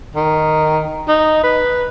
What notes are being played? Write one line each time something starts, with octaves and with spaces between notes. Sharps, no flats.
D#3
D#4
B4